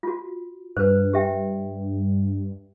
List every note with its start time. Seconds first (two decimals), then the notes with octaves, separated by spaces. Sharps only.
0.03 F4 F#4
0.77 G2 B4 C5
1.13 G4 E5 G5